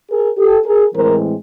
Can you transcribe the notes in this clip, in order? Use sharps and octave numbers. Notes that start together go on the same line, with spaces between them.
G#4 A#4
G4 A4
G#4 A#4
A2 E3 G#3 C4 A#4 C5